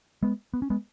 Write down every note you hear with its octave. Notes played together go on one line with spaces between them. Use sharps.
G#3 B3
B3
C#4
G#3 B3